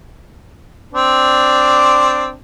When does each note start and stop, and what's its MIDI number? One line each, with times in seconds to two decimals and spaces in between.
0.93 2.34 60
0.93 2.34 62